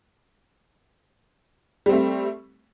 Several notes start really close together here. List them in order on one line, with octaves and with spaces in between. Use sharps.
G3 C4 A3